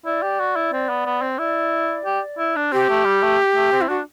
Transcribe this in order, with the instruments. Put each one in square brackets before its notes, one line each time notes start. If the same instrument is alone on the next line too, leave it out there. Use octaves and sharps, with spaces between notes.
[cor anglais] E4 [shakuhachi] D5
[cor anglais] G4
F#4
E4
C4
B3
B3
C4
[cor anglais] E4 [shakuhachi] D5
[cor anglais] G4
E4
D4
[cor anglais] C4 [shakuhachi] G4
[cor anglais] A3
G3
A3
A3
C4
[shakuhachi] E4
[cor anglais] D4 [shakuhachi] F#4